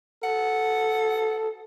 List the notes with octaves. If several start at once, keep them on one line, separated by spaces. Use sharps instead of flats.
A4 F#5